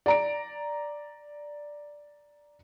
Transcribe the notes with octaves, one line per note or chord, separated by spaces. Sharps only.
D5 A#5 D7